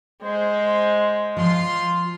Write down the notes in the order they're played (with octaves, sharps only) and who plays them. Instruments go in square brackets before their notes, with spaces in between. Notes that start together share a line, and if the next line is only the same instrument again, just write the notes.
[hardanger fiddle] G#3 [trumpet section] C5
[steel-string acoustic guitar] F3 [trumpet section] F4 C6